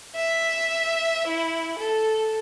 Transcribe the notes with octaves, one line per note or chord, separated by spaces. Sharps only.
E5
E4
A4